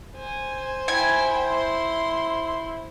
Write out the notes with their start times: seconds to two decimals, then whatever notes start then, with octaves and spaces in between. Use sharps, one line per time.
0.17 C5 G#5
0.88 E4 G5 G#5
1.47 E4 C6